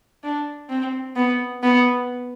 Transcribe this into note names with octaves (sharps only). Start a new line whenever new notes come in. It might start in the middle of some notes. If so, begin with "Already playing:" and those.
D4
C4
B3
B3